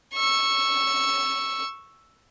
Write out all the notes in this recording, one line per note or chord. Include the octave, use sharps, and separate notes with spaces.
C#6 E6